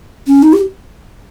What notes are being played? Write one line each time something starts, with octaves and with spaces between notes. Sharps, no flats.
C#4
D#4
G4